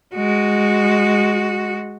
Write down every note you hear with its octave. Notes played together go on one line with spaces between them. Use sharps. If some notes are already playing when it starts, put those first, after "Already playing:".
G#3 F#4